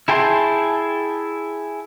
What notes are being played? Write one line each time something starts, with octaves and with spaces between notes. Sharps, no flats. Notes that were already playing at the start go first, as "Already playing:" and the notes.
E4 G#4 G5 A5 C6